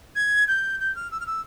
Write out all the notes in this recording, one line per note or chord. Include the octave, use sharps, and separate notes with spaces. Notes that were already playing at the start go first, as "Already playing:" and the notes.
G#6
G6
G6
F6
E6
F6
E6